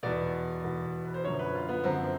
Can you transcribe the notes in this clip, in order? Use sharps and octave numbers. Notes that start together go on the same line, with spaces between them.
E2 B2 D5
E2 B2
B4
C5
F#2 D3 F3 C#5
B4
F4
B3
F#2 D3 F3 C4